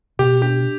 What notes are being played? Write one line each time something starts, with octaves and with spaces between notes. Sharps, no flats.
B2 G4
D4 G4